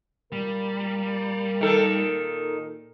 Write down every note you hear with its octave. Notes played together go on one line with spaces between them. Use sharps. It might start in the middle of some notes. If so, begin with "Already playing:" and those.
A#2 G3 A#4
D#3 A4